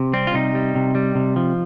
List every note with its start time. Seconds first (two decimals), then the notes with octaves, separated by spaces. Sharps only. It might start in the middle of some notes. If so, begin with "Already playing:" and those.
Already playing: C3
0.14 G3 C4
0.27 F4
0.34 C3 D#4
0.55 G3
0.75 C3
0.95 G3
1.15 C3
1.36 F3